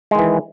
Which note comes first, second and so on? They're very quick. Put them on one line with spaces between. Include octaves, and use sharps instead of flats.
G#3 D#3 E3